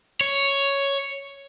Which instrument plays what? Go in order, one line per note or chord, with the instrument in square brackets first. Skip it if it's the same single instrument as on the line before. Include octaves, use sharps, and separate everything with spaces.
[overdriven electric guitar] C#5